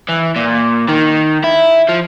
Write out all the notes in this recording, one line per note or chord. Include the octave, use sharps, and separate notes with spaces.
E3
A#2
D#3
E4
F3